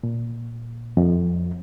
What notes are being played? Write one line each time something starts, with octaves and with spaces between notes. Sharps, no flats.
A#2
F2